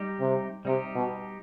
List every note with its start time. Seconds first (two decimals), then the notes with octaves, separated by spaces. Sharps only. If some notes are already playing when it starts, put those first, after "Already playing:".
Already playing: G3 D#4 G4
0.20 C3
0.65 C3 G3 D#4 G4
0.95 B2